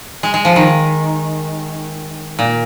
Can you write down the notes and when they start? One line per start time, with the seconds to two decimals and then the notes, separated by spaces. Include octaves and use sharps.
0.23 G#3
0.34 G#3
0.45 F3
0.56 D#3
2.39 A#2